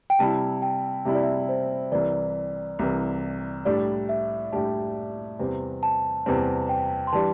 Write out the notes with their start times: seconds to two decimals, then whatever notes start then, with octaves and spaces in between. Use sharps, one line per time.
0.10 G5
0.19 C3 G3 E4 A5
0.62 G5
1.05 C3 G3 E4 E5
1.15 D5
1.23 E5
1.49 C5
1.92 C2 C3 E3 D5
2.79 C2 C3 E3
3.65 A2 G3 D4 G4 D5
4.09 E5
4.52 A2 G3 D4 G4 A5
5.39 E2 C3 G3 C4
5.83 A5
6.26 E2 C3 G3 C4
6.69 G5
7.07 C6
7.13 E3 G3 D4 G4 A5